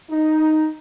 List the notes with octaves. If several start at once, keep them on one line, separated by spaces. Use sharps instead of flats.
D#4